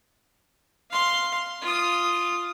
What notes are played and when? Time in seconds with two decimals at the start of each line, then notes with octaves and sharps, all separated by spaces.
0.91 F5 C6
1.62 F4 D#6